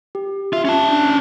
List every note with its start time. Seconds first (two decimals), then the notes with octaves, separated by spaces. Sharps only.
0.15 G4
0.53 F4 E5
0.65 C#4 A5
0.88 D4